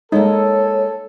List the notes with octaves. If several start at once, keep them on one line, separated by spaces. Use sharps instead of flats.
G#3 A#3 D#4 A4 C#5